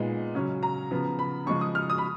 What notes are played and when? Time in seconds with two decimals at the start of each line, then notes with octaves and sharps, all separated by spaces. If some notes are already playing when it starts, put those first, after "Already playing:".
Already playing: A#2 G#3 B3 D#4
0.35 C#3 F#3 C#4
0.63 A#5
0.91 C#3 F3 B3
1.19 B5
1.46 C#3 F3 G#3 C#6
1.61 D#6
1.75 F6
1.90 D#6
1.98 B5